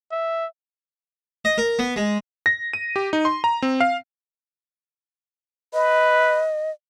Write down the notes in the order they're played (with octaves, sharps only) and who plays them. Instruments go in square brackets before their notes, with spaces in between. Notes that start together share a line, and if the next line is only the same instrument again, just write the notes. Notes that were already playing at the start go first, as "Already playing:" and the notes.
[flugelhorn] E5
[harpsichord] D#5
A#4
B3
G#3
[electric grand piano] A#6
D#7
G4
D#4
C6
A#5
C4
F5
[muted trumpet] B4 [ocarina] D#5